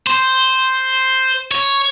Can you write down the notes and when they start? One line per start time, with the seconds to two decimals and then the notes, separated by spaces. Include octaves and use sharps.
0.07 C5
1.52 C#5